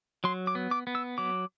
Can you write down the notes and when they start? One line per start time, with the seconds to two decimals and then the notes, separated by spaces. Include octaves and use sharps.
0.24 F#3 C6
0.47 D6
0.55 B3
0.71 D6
0.87 B3
0.95 E6
1.18 F#3 D6